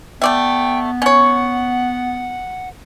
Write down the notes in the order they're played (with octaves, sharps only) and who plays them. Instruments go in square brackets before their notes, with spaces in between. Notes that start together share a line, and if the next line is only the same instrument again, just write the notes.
[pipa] A3 D5 E5 [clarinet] B3 [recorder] G5
[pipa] C#4 C#5 [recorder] F#5